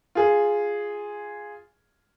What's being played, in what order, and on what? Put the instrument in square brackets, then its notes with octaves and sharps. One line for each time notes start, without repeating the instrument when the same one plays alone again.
[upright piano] F4 G#4